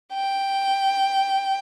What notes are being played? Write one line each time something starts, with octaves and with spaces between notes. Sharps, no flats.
G5